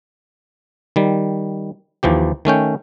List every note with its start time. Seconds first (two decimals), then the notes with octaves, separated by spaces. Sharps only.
0.96 D#3 G3
2.03 D#2 E3 F3 G4
2.45 D#3 A3 C#4 G5